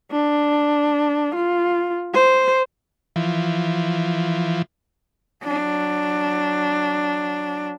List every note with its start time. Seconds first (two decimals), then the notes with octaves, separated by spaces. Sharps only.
0.11 D4
1.35 F4
2.14 C5
3.16 E3 F3
5.44 F#3 D4